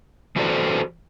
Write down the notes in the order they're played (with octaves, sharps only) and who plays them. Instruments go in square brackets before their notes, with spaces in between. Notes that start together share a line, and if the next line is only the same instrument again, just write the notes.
[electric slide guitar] E3 F#4 G4 A4 C5 D5